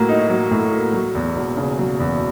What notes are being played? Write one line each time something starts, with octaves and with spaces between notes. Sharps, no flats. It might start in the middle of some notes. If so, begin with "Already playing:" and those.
Already playing: A2 F#3 A#3
D#4
F#3
A2
A#3
F#3
E2
E1
C#3
F#3
E2